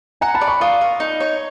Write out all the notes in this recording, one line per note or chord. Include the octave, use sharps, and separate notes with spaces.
F#5 G#5 A#5
A5 B5
D5
B5 C#6
F4 C#6 D#6
A#4
D#4
C#5